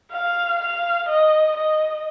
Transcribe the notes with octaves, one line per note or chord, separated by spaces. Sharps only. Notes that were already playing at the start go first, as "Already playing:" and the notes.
F5
F5
D#5
D#5